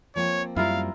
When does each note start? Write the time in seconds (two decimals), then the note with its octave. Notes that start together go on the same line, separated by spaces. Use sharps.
0.16 F3 A#3 C4 C#5
0.56 F#2 G3 E4 F4 A#4 F5